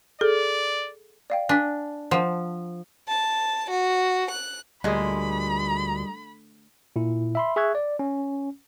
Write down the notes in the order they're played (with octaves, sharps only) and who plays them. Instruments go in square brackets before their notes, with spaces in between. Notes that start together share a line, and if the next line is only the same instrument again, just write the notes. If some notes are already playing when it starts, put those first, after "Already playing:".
[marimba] G#4 A4 [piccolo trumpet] D5
[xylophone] D5 F5 G5
[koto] D4 [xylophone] G#5 B6
[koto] F3 [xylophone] C5 F#5
[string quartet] A5
F#4
F#6
[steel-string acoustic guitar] D2 [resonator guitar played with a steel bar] A#2 G#3 [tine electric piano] G3 D#6 [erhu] B5
[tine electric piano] A#2 E4
E5 B5 C6
G#4 E5 C#6 F#6 G#6
D5
C#4